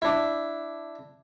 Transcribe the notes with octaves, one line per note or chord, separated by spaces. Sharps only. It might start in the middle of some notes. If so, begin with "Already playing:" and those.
D4 E4